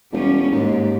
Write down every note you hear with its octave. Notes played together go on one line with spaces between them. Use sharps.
E1 G3 C#4
D#2 G#2